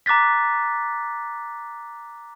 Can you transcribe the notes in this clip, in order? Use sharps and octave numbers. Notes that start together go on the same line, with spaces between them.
A#5 D6 F#6 A6 B6